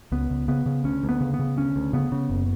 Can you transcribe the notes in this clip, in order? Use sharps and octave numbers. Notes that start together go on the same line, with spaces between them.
C#2 B3
C#2
C#3 B3
C#3
D2 C#4
D2
B3
C#3
B3
C#3
D2 C#4
D2
C#3 B3
C#3
F#1